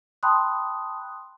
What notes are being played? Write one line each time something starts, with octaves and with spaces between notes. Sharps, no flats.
G5 A5 B5 C6 D#6 F#6